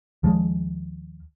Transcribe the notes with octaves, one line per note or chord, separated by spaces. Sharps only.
D#2 F3 G#3